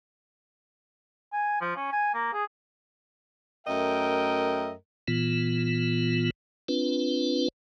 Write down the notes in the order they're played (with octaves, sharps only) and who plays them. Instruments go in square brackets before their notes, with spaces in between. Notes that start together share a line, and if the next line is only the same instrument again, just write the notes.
[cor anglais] G#5
F3
C#4
G#5
A#3
G#4
[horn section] F#2 A3 A#4 D#5 E5 G5
[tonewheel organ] A#2 E3 B3 F4
C4 D4 F4 B4